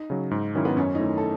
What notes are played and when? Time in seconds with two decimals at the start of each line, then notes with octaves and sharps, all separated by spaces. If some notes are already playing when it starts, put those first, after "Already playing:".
Already playing: D#4
0.10 C#3 F#3
0.31 G#2
0.55 D#3 F#3 C#4 E4
0.65 B3
0.77 F#2 C#4
0.95 D#4
0.99 D#3 A3 E4
1.18 A4